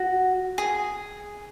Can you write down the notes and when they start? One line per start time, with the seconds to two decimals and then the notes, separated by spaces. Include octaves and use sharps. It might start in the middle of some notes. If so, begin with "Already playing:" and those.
Already playing: F#4
0.58 G#4